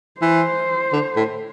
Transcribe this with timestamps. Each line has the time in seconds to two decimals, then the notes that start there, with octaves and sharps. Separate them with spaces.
0.21 E3 C5
0.93 D3
1.16 A2